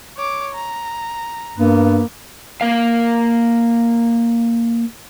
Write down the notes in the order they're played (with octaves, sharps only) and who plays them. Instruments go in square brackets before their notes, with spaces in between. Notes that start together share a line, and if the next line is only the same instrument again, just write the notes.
[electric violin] C#5 D6
A#5
[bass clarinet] G2 [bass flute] A#3 [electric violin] B3
[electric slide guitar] A#3 A#4 F5